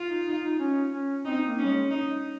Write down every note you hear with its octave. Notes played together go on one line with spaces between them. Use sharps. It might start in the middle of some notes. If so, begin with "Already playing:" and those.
Already playing: F4
D#4
D#4
D#4
C#4
C#4
C4 D#4
A#3
C#4
G3
G#3
D#4